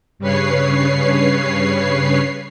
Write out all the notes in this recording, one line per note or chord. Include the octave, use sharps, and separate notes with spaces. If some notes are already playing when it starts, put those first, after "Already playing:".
G2 C#3 B4 C#5 C7